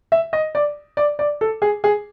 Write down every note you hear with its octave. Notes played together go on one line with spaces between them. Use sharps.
E5
D#5
D5
D5
D5
A4
G#4
G#4